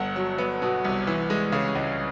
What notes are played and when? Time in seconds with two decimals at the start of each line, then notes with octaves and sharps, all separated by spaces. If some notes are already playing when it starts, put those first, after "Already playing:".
Already playing: G1 F#5
0.16 F#3
0.38 B3
0.62 B2
0.84 C2
1.07 E3
1.30 G#3
1.52 C#3
1.75 C#2